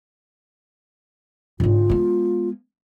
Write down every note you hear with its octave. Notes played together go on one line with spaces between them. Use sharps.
G#2 D3 F4
G#3 B3